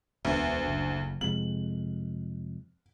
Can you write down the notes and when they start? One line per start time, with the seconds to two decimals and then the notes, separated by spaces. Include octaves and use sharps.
0.25 E1 D2 B3
0.66 F#1
1.21 F2 C3 G#3 F#7